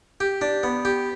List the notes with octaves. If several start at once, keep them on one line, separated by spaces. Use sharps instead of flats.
G4
D4
B3
G4